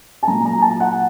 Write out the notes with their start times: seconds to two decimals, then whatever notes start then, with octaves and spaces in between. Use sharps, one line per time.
0.23 A5
0.27 A#2 F#3 A#5
0.45 A#5
0.62 A5
0.80 F#5